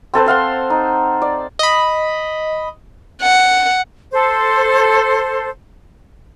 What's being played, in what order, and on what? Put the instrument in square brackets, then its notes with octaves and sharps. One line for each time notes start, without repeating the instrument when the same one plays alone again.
[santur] C4 A4 B4 C5
C5 F5 F#5 C6
D#4
D5
[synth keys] D#5 B5
[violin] F#5
[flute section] A4 C5